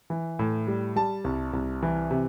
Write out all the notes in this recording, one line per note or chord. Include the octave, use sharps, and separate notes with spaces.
E3
A2
G3
G3 A5
C2
C2
E3
C3